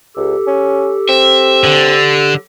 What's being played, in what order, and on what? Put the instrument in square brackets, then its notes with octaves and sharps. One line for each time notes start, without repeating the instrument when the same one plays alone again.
[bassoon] C#2 [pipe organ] G4 A4
[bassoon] C#4
[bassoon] C4 [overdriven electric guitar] E5
[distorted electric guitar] D3